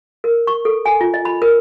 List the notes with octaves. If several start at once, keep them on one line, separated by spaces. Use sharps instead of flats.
A#4
C#6
A4
G#5
F4
D#5
B5
A#4